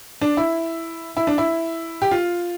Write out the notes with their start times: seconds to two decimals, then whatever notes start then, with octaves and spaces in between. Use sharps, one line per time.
0.21 D4
0.37 E4
1.17 E4
1.27 D4
1.38 E4
2.02 G4
2.11 F4